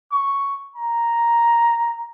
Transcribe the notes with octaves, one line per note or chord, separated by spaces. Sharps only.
C#6
A#5